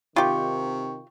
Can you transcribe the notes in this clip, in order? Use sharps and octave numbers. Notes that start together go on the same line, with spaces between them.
C3 D#3 F4 G4 G5 C#6